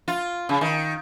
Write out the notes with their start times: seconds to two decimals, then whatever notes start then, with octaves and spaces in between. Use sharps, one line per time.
0.08 F4
0.49 C#3
0.61 D#3